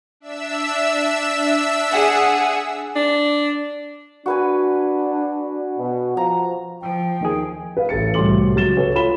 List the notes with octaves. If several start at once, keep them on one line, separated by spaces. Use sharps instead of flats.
D4 E5 E6
G#4 F#5
D4
D4 F#4 B4 G#5
B2
F3 A#5
F3 G5
D#2 D#3 G#4
B4 F5
A1 A4 A6 C#7
C2 A2 F#4 C6 D6 F#7
C#2 F#3 F#4 A6 E7 G7
A4 B4 C#5
F4 B5 E7 G7